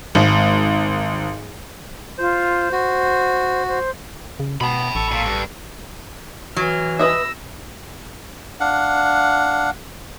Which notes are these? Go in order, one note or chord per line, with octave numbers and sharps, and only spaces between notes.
G#1 G#2
F4 C5
F#4 C5
C5
C#3
B2 B3 A5 B5
A1 A4 C#6
A#2
G2
E3 F#3 F6
B4 D#5 E5 E6 A#6
D4 F5 F#5